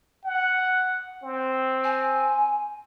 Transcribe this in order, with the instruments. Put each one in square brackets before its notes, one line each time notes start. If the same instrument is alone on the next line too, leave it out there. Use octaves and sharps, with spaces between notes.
[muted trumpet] F#5
C4
[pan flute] G#5